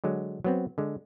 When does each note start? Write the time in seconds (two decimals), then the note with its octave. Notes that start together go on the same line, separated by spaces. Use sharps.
0.04 D3 F#3 G#3
0.44 F#3 B3 C4
0.78 D3 G#3